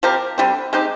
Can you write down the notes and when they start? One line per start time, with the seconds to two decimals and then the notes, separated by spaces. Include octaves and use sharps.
0.03 F3 C4 G4 A#4
0.38 D3 G3 C4
0.73 G#3 C4 D#4 G4